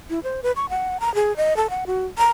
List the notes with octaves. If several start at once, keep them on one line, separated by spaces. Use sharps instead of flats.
E4
C5
B4
C#6
F#5
A#5
G#4
D#5
A4
F#5
F#4
A#5